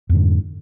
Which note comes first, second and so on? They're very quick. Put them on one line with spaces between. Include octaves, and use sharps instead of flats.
F2 G#2 D3